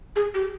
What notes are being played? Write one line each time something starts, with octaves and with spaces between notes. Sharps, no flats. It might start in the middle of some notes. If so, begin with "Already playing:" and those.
G#4
G4